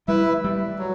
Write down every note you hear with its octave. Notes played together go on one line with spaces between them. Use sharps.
G3 E4 B4 E5
G3
F#3